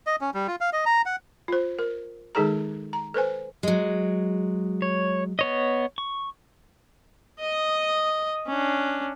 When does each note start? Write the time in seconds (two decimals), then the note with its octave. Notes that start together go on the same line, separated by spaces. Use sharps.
0.07 D#5
0.21 C#4
0.34 G3
0.48 F4
0.61 F5
0.73 D#5
0.86 A#5
1.06 F#5
1.48 F4 C5
1.79 A#4
2.35 D#3 G#3 D#4 G#4 A4 A#5
2.93 A#5
3.14 A4 B4 C5 G#5
3.63 F#3 G#3
4.82 C#5
5.39 B3 C#5 D#5
5.98 C#6
7.40 D#5 D#6
8.47 C#4 D4